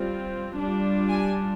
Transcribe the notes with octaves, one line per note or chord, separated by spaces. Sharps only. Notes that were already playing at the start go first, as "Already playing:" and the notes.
Already playing: G3 C4 F4
G3 D4 F4
G#5